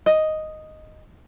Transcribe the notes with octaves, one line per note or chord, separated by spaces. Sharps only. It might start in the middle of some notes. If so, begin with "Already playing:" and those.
D#5